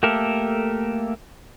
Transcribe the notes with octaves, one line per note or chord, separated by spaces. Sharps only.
A3 A#3 G4 A4 A#4